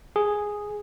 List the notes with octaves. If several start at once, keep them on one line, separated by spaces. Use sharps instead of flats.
G#4